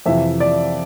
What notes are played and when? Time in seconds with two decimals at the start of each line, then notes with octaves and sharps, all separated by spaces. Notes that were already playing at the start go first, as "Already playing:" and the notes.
0.06 F2 C3 E3 E5
0.40 D5